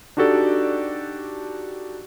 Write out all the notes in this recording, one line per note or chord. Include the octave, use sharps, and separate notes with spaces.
D4 D#4 F#4 G4 A4 D5